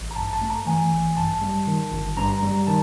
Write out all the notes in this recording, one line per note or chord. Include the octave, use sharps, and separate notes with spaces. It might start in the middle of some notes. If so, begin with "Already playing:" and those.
Already playing: A1
A#5
G2 A5
A5
A3
A#5
E3 G#5
A1
G2 A5
G3
D#3
G1
G2 A#5
G3
D#3 A5